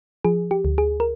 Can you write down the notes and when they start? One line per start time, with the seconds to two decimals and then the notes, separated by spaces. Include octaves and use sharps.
0.25 F3 G#4
0.51 G4
0.65 D2
0.78 G#4
1.00 A#4